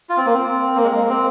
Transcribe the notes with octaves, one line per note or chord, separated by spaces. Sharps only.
F4
C4
A#3
C4
A#3
G#3
A#3
C4